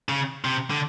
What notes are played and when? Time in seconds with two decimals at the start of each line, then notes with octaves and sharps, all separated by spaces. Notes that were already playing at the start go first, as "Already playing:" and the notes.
0.09 C#3
0.45 C3
0.70 D3